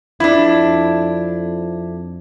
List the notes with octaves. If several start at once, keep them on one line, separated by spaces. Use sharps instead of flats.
F2 D4 E4